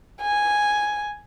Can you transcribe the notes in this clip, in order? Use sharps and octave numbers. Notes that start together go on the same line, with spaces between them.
G#5